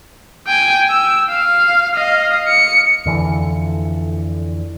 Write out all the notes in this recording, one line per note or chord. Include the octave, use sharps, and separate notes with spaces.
G5 G#5
E6
F5
D#5 F5
C#7
F2 D3 E3